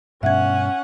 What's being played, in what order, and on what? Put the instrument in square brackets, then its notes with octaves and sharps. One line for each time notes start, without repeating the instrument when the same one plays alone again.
[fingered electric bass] G2 B2 [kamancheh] C#4 F#5 [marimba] E5 G#6